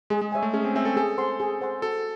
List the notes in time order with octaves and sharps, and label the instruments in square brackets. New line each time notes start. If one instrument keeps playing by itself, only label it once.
[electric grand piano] G#3 [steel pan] G#4
[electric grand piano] G#3
[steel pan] C#5 E5 G#5
[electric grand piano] A3
[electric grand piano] C#4 [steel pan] G#4
[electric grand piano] C4
[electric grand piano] C4 [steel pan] C#5 E5 G#5
[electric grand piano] A4
[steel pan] G#4 [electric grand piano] A4
[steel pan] C5 F#5 C6
G#4
C5 F#5 C6
[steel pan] F#4 [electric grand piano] A4